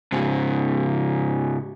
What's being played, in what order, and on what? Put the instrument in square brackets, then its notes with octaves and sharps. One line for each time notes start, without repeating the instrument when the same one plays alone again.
[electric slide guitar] G#2 C#3